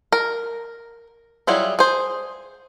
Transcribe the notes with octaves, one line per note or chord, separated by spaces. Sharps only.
A#4
F#3 G3 E4 F4 G#4
G#4 C5